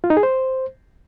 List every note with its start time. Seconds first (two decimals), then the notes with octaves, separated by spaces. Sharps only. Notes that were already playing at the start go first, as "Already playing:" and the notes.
0.04 F4
0.10 D#4
0.17 G#4
0.23 C5